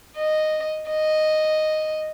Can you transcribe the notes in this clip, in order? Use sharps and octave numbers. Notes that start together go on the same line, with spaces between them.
D#5
D#5